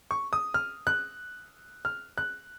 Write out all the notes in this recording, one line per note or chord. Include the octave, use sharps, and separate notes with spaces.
C#6
D#6
F6
F#6
F6
F#6